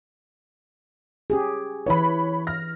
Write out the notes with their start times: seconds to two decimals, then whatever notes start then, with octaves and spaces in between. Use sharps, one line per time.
1.30 C#4 G4 G#4
1.86 E3 E4 B4 C#5 B5
2.47 F6 A#6